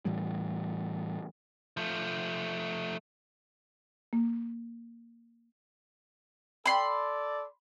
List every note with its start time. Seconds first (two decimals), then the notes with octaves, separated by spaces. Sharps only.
0.05 A2 E3 G3
1.77 F3 A3
4.13 A#3
6.66 A4 D5 B5 C6